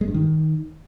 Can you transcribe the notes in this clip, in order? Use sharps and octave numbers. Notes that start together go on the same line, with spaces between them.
G#3
G2
D#3